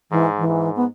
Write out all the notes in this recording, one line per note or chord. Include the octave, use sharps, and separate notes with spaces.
G#2 E3
E3
G#2
B3